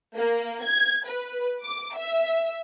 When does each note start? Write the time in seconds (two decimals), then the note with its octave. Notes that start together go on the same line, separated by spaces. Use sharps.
0.17 A#3
0.64 G#6
1.07 B4
1.64 D6
1.96 E5